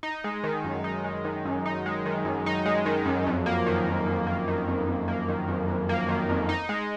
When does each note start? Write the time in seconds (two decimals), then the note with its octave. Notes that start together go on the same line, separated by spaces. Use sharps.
0.03 D#4
0.24 G#3
0.44 D#3
0.64 F#2
0.84 D#4
1.04 G#3
1.25 D#3
1.45 F#2
1.66 D#4
1.86 G#3
2.06 D#3
2.25 F#2
2.46 D#4
2.65 G#3
2.86 D#3
3.06 F#2
3.27 F2
3.46 A#3
3.67 D#3
3.88 F2
4.07 F2
4.27 A#3
4.48 D#3
4.68 F2
4.87 F2
5.08 A#3
5.29 D#3
5.48 F2
5.68 F2
5.89 A#3
6.08 D#3
6.29 F2
6.49 D#4
6.69 G#3